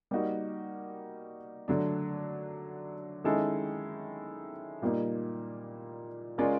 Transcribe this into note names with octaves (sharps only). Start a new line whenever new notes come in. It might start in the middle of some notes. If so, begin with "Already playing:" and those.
G3 A#3 D#4 F#4 A#4
D3 F#3 A3 D4
D#3 G#3 C#4 E4 A4
A#2 G3 A#3 D#4
G#3 C#4 F4 A#4 D5